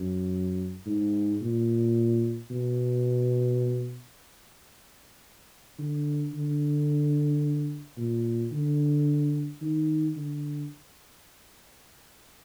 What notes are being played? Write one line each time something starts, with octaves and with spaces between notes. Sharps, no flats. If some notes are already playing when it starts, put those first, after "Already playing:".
Already playing: F#2
G#2
A#2
B2
D3
D3
A#2
D3
D#3
D3